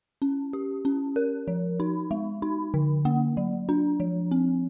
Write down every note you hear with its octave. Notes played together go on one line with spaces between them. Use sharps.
C#4
G4
C#4
A#4
F3
D#4
G#3
D#4
D3
A#3
F#3
D4
F3
C4